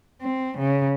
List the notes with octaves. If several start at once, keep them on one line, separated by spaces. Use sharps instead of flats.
C4
C#3